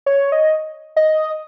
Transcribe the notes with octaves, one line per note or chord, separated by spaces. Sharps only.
C#5
D#5
D#5